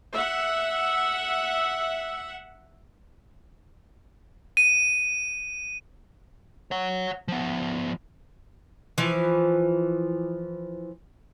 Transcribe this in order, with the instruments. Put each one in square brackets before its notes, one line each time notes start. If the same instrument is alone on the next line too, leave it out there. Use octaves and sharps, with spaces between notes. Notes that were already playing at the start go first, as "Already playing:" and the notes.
[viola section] E5 F#5
[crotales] D#7
[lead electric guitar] C#5 F#5
F3 B3
[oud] E3 F3